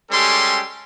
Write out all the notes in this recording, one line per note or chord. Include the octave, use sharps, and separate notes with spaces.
G3 G#3 C#4 G4 A4 C6